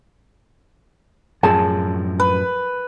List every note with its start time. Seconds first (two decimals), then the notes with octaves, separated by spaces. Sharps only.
1.43 F#2 A2 F3 G#4 A5
2.20 B4